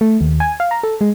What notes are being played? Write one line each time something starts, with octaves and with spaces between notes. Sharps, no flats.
A3
D#2
G#5
F5
A#5
A4
G#3